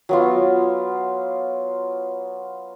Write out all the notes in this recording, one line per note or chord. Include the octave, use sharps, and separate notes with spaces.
F#3 B3 F4